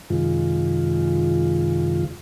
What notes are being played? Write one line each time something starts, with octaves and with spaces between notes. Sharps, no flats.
F#2 C3 D#3 G#3 F4